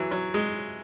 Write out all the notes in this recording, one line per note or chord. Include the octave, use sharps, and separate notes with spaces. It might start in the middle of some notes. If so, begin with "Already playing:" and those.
Already playing: E3 F#3
F#3
G#3